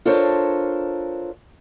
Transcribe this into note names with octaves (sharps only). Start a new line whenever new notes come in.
D4 F4 A4 A#4 C5 C#5